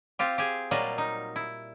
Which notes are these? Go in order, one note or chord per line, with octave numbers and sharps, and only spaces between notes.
C4 F4 G4
G4 G#4
A#2 F#3 G3 D#5 F5
D#4
E4